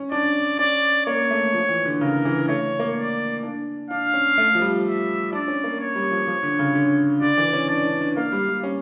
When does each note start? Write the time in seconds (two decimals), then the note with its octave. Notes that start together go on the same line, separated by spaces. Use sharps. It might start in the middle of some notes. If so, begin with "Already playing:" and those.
Already playing: C#4
0.12 D4 D5
0.59 C#4 D5
1.06 A#3 C#5
1.30 A3
1.54 F3
1.69 E3
1.85 D3
2.01 C#3 A#4
2.25 E3
2.48 A3 C#5
2.79 A#3
2.96 D5
3.43 D4
3.90 D4 F5
4.14 C#4
4.38 A3
4.55 F3
4.62 G3
4.85 E5
5.33 D4 D5
5.48 C#4
5.64 A#3
5.80 C#5
5.95 G3
6.11 F3
6.27 F3
6.43 D3
6.59 C#3
6.75 D3
7.22 D3 D5
7.38 E3
7.53 C#4
7.69 D4 D5
7.85 D4
8.01 D4
8.17 A#3 F5
8.32 G3
8.48 G3
8.63 C#4